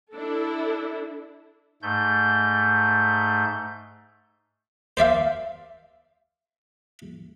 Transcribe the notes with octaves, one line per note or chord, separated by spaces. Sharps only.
D4 E4 A4
G#2 A3 G6
C5 D5 E5 F5